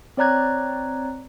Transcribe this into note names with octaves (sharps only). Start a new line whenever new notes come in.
C4 C#5 D5 A#5 F#6 G#6